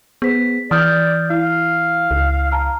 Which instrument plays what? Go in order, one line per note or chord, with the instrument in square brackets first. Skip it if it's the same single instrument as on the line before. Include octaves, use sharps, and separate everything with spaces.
[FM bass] B3 [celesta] G#4 C5 B6
[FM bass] E3 [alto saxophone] D5 [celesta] D#6 F6 G6
[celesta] E4 [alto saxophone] F5
[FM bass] C#2
[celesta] A5 A#5 F6